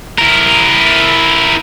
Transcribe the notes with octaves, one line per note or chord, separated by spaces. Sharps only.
E4 A#4